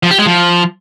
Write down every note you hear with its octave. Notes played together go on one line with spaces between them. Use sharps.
F3
G4
G#3
F3